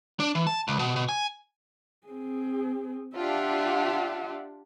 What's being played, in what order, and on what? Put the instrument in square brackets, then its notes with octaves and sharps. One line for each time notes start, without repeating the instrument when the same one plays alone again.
[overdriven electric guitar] D4
E3
A5
C#2
B2
B2
G#5
[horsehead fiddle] C4 G#4
[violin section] D4 F4 G4 [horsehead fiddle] E5 F#5